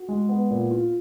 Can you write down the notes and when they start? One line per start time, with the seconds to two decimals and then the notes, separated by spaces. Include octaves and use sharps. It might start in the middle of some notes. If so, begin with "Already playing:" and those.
Already playing: F#4
0.09 G#3
0.29 B3
0.50 A#2
0.71 F4